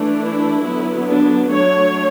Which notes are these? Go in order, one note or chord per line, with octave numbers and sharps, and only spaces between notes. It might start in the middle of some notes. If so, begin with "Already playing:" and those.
Already playing: E3 A3 D4
E4
D3 F#3 B3
D4
F#3 A3 D4 C#5